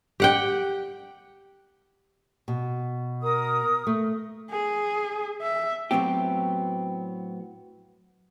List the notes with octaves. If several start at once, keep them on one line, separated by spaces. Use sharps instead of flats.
G4 F#5 G5
B2
A#4 D#6
A3
G#4
E5
A2 F#3 B3 C4 G4